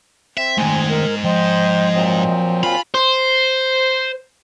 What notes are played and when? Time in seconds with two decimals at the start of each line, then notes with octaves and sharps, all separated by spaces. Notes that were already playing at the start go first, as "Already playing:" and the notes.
0.37 C4 E5
0.58 G#2 D#3 G#3 A3 G#5
0.89 A#4
1.24 F3 C5 D#5 G5
1.95 A#2 F#3 C4
2.63 F4 F5 G#5 B5
2.94 C5